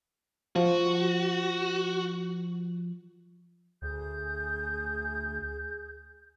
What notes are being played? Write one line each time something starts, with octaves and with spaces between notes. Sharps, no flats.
F3 F#4
D2 G#4 D#6 G6